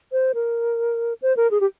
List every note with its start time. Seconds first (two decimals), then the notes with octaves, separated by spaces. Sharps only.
0.12 C5
0.35 A#4
1.22 C5
1.37 A#4
1.51 G#4
1.61 G4